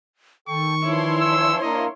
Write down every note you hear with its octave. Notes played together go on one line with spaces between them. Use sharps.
D#3 A4 G5 C#6
E3 F3 D4 E4 C#5 C6
E6
A#3 D4 A#4 D#5